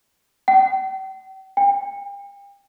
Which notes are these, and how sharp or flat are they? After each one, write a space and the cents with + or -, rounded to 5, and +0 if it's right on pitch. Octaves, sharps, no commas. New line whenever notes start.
G5 -40
G5 +40